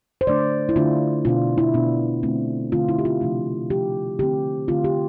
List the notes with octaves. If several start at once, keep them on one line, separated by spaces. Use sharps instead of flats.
C5
D3 A3 D4 D5
E4
D3 A3 D4 F4
B2 B3 D4 F4
E4
B2 B3 D4
D3 A3 C4
D3 A3 C4 F4
E4
G4
F4
C3 F3 A3 D4
C3 F3 A3 D4 G4
D3 A3 C4 G4
D3 A3 C4 F4
G4